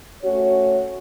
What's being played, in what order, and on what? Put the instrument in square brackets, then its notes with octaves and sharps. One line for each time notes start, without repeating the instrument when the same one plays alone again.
[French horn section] A3 C#4 F#4 C#5